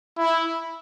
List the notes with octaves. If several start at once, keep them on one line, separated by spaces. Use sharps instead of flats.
E4